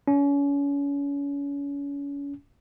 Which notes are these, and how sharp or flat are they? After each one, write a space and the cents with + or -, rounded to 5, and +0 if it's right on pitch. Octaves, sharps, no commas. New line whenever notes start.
C#4 +35